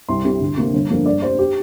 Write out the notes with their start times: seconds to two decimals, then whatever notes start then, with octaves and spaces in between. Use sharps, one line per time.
0.09 C2 C6
0.25 C3 G3
0.40 D2
0.57 C3 A#3 D4
0.74 G1
0.89 F2 F3 A#3 D4
1.06 G2 D5
1.22 G3 D4 C5
1.39 G4